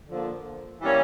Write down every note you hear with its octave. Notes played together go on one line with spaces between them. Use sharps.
D3 F3 A#3
E3 G3 A#3 C#4